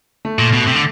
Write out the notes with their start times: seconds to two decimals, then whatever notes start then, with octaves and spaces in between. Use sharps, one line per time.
0.25 A3
0.39 A#2
0.53 B2
0.67 C3
0.76 D3